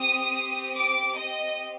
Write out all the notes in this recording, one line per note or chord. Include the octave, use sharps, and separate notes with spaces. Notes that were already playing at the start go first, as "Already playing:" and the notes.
Already playing: C4 G4 D#6
D6
D#5